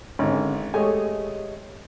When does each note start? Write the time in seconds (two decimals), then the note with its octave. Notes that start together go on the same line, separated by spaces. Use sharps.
0.19 G#1 G#2 D3 C#4
0.74 G#3 A3 G4 C#5 D#5 G#5